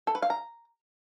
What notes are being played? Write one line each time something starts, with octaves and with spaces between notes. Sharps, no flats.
A4
B4
F5
A#5